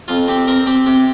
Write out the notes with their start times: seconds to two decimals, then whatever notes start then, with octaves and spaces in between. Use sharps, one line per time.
0.08 F2 F4
0.28 C4 G4
0.47 C4 A#4
0.67 C4 G4
0.86 C3 G4